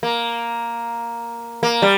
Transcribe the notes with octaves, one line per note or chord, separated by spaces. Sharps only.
A#3
A#3
G3